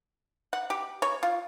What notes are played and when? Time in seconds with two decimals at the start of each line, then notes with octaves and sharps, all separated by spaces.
0.53 F#5
0.70 G4
1.02 C#5
1.23 F4